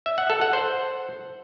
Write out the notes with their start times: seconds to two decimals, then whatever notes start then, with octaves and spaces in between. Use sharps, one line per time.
0.06 E5
0.18 F#5
0.30 A4
0.41 F#5
0.53 C5